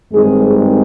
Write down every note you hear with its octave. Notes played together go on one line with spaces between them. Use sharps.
G2 D#3 G#3 C4 D#4 G#4